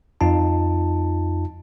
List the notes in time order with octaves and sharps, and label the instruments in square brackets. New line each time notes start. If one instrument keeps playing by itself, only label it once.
[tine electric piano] F2 D#4 F4 A5